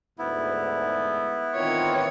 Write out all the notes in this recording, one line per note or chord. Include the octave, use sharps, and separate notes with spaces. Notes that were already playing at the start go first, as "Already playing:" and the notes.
D2 G#2 B3 E4
D#3 E3 C4 D#4 F4 A#4 C#5